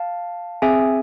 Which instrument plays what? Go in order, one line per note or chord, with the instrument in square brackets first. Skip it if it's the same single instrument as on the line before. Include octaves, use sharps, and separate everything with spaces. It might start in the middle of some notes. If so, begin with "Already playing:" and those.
Already playing: [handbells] F5 A5
C4 G#4 E5 G#5